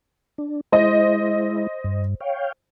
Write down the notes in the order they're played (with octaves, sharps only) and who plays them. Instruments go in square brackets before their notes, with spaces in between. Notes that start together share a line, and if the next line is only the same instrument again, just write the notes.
[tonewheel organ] D4
[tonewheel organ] G#3 E4 [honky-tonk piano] C5 D#5
[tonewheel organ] G2
C#5 F5 G5